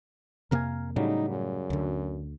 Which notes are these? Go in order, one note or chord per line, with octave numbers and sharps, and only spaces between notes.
F2 C3 A#3 A#4 F5 G#5
A2 C#3 F#3 G3 D#4
F#2
D2 D3